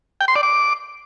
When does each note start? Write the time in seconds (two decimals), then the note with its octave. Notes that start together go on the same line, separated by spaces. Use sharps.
0.21 G5
0.28 C6
0.36 D5
0.43 D6